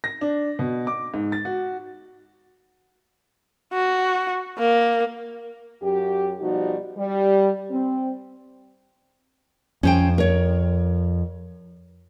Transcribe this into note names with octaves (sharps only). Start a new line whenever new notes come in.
A#6
D4
B2
D6
G#2
A6
F#4
F#4
A#3
F#2 G4
B2 F3 G3 D#4 F#4
G3
C4
F2 C#4 C5 G5
A#4 C#5